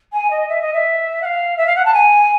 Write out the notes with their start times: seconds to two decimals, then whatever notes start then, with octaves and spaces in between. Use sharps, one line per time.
0.13 G#5
0.31 D#5
0.49 E5
0.61 D#5
0.73 E5
1.22 F#5
1.25 F5
1.57 E5
1.67 F5
1.76 F#5
1.85 A5
1.94 G#5